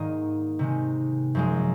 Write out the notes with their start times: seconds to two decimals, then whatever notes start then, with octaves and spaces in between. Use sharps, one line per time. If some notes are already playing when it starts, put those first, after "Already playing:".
Already playing: G#2 D#3 A#3 D#5
0.59 C3 D#3 G#3
1.35 F#2 F3 G#3